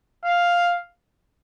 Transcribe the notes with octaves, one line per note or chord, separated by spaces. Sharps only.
F5